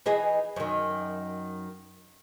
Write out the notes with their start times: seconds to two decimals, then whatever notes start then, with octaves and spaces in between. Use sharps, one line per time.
0.06 E3 D#4 G#4
0.56 F#2 D#3